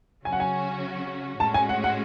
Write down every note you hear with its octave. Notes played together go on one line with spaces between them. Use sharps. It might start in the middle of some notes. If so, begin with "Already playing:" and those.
C#3 F#3 C#4 F#4 G#5
F#5
G#5
A2 G#3 C#4 F#4 A5
G#5
F#5
F#5